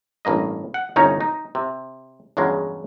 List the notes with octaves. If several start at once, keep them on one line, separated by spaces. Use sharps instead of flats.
A1 G2 A#3 D#5
F#5
G1 C2 C#4 D#4 C#5 A#5
D#4
C3
E2 G2 C#3 F#3 G#3